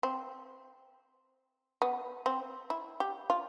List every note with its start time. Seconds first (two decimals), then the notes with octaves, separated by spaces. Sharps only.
0.03 C4
1.82 B3
2.26 C4
2.70 E4
3.00 G4
3.30 F4